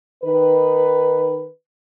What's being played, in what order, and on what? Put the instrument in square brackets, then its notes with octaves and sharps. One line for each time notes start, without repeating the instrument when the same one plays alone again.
[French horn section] D#3 B4